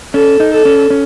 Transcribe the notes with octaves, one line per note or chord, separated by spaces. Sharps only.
C#4 A4
D#4
A4
C#4
C#4